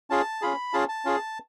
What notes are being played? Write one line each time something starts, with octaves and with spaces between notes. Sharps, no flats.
C#4 F4 G#4 A5
C#4 F4 G#4 B5
C#4 F4 G#4 A5
A5
C#4 F4 G#4